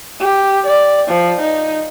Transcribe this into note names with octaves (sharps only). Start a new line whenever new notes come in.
G4
D5
F3
D#4